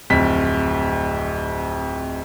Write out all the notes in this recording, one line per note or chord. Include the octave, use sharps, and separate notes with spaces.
D1 F2 B6